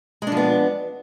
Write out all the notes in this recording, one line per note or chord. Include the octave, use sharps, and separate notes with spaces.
F3 G#3 B3 D4